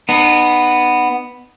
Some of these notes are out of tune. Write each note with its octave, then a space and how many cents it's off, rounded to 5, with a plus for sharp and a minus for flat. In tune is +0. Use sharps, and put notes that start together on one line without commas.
B3 +0 D#4 -35